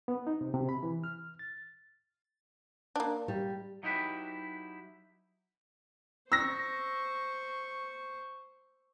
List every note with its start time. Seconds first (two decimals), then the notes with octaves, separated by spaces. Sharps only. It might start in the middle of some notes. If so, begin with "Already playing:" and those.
0.08 B3
0.27 D#4
0.41 C3
0.54 C3
0.69 B5
0.83 E3
1.04 F6
1.39 A6
2.96 A#3 D4
3.28 G3
3.83 F#3 D#4 E4 G4 B4
6.32 C5 C#6 E6 A#6